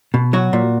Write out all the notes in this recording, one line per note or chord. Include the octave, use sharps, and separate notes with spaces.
B2
F#3 F#4
A#2